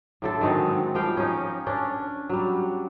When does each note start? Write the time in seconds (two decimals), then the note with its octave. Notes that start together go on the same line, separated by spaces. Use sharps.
0.22 A2 D3 A4
0.41 D#3 F#3 G#3 C4
0.95 F3 G3 F5 G5
1.17 C#4 D#4
1.67 C#4 D4
2.29 F#3 G3